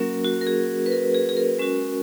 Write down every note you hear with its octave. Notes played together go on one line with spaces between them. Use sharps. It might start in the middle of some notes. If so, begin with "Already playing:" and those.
Already playing: F#3 A#3 C#4 F#4 A#4
F#4
A#4
G#4
B4
A#4
G#4
G#4
A#4
G#3 C#4 F#4